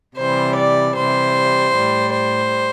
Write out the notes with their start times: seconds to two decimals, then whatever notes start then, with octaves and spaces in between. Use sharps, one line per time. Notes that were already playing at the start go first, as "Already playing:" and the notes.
0.17 C3 E3 G3 C5
0.57 D5
0.96 C3 E3 G3 C5
1.75 A2 G3
2.14 C5